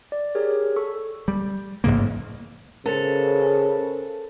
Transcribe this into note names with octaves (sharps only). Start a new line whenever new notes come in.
D5
G4 G#4 A#4 C#5
A4 C#6
G3
A1 G#2 C#3 A#3
C#3 A4 A#4 C5 A6